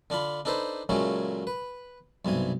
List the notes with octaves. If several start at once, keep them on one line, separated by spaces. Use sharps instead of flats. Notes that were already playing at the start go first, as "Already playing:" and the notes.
D3 D4 F4 B5
D4 D#4 A4 B4 C5
A#2 C#3 F#3 G#3 A3 C#4
B4
B1 G2 C3 G#5